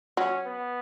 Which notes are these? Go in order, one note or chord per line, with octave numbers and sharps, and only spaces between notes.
F#3 C#4
B3